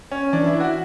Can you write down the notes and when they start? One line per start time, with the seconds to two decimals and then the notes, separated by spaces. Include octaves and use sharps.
0.12 C#4
0.33 E3 D4
0.46 E4
0.60 F#4